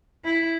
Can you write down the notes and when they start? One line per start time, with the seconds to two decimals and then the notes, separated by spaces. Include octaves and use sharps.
0.25 E4